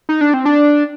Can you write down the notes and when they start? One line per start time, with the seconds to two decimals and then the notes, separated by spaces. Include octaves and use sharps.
0.09 D#4
0.21 D4
0.34 C4
0.45 D4